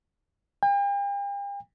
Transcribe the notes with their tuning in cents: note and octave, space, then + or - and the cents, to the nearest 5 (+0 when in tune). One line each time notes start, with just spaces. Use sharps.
G5 +45